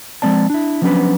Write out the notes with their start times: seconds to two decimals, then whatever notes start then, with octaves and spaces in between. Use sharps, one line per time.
0.22 F3 G#3 C4 D5 A5
0.50 D4 E4
0.82 F3 F#3 B3 C#4 D4 B4